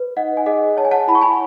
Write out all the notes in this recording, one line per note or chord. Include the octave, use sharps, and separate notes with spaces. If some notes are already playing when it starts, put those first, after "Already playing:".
Already playing: B4
D#4 D#5 F#5
G#5
G#4 D#5 F#5
C#5 A5
G#5
F#5 A5
E4 B5
C#6
G#5 B5